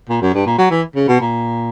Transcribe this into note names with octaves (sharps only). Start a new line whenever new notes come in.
A#2
F#2
G2
A#2
F#3
E3
C#3
B2
A#2